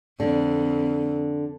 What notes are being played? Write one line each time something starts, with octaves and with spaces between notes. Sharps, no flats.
F2 D3